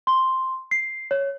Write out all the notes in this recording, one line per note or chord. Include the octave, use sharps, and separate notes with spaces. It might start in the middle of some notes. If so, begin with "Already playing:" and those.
C6
C7
C#5